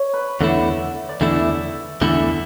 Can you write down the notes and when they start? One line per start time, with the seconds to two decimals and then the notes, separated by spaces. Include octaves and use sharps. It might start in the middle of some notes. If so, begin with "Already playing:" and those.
Already playing: C#5
0.14 B4
0.40 E2 D3 A3 E4 F#5
1.09 D5
1.21 E2 D3 A3 E4 E5
2.01 E2 D3 A3 E4 E5